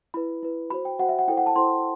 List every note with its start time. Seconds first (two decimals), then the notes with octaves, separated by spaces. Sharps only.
0.14 E4 B4 B5
0.43 E4 B4
0.70 F#4 C5 B5
0.85 G5
0.99 F#4 C5 F#5
1.09 E5
1.19 F#5
1.28 E4 A4 C5 G5
1.37 F#5
1.46 A5
1.56 E4 A4 C5 C6